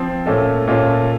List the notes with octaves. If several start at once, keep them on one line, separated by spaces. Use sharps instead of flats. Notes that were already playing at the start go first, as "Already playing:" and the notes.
Already playing: F3 C4
A#2 A3 C#4 F4 A4
A#2 A3 C#4 F4 A4